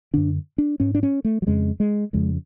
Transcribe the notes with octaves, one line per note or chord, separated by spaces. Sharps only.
F#2 D3 D4
D4
G#2 C#4
D4
C#4
A3
F#3
F2 C#3 G#3
G#3
F2 C#3 G#3